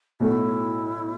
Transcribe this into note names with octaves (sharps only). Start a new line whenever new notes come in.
B1 A2 A3 E4 F#4 A4